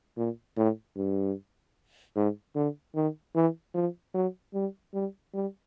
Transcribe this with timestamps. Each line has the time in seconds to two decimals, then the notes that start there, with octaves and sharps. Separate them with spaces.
0.17 A#2
0.57 A2
0.97 G2
2.16 G#2
2.56 D3
2.95 D#3
3.35 E3
3.75 F3
4.14 F#3
4.54 G3
4.94 G3
5.34 G3